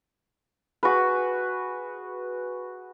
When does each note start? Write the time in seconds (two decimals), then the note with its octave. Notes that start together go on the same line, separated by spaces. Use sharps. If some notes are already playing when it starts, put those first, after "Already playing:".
0.83 F#4 G#4 B4